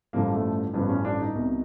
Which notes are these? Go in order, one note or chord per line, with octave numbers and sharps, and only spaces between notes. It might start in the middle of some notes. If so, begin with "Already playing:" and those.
A1 G2 D3 F3 A#3
A3
A1 G2 D3 F3 B3
C#4
D4
D#4
C2 B2